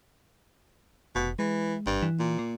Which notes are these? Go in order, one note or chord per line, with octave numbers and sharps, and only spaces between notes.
F1 B2
E3 G#3
G#1 G2
E3
A#2
A#3